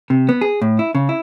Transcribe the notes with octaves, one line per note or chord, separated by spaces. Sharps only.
C3
B3
G#4
A2
E4
C#3
E4